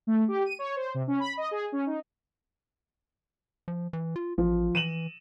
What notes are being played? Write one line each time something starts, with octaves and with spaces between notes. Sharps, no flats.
A3
G4
D#7
C#5
C5
C3
C#4
B5
D#5
G#4
C#4
D#4
F3
E3
F4
A1 F3
E3 D#7 E7 F#7